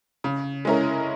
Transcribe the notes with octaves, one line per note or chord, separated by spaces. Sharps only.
C#3
G#3 C#4 E4 A#4